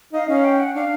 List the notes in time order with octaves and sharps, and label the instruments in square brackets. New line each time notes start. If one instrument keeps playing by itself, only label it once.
[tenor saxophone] D#4 [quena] F5
[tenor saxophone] C#4 [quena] F5
[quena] G5
F#5
[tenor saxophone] D4 [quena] F5